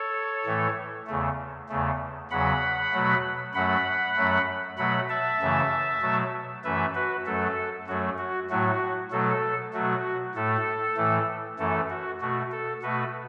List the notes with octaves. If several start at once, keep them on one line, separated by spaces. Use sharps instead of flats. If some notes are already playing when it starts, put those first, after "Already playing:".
Already playing: A4 C#5
A2 E3 A3
E2 C#3 A3
E2 C#3 A3
E2 C#3 F#3 F#5 B5
B2 F#3 A3
F#2 F#3 A3 F#5 B5
F#2 F#3 A3
B2 F#3 A3 F#5 B5
E5 A5
F#2 C#3 E3 A3
B2 F#3 A3
F#2 E3 A3 B4 E5
F#4 B4
F#2 F#3 A3 A4
F#2 F#3 A3 F#4
F#4
A2 F#3 A3 F#4
B2 F#3 A3 A4
B2 F#3 A3 F#4
A2 A3 A4
A2 E3 A3
F#2 E3 A3 A4
F#4
B2 A3 F#4
A4
B2 A3 F#4 B4